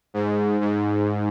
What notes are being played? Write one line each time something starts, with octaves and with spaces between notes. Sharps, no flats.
G#2
G#2